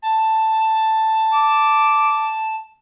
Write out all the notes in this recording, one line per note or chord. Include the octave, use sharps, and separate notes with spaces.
A5
D6